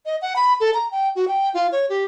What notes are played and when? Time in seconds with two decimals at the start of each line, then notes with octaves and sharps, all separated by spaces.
0.06 D#5
0.22 F#5
0.36 B5
0.60 A4
0.74 A#5
0.91 G5
1.16 F#4
1.28 G5
1.54 F4
1.72 C#5
1.90 G4